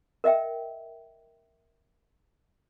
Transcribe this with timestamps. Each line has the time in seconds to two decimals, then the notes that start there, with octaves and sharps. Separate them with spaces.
0.24 A#4 D#5 E5 G5